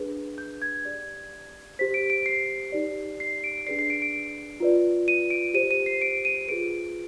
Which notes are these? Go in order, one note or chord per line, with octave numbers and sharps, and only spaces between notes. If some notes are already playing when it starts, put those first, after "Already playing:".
Already playing: D4 G#4 B4
G6
G#6
G4 D5
G4 C5 B6
D7
D7
C7
D#4 G4 D5
C7
D7
D4 G#4 B4 D5 C7
C7
D7
D7
F4 B4 D5
D#7
D7
G4 C5 D#7
D#7
C7
D7
D#7
F4 G#4 B4 D7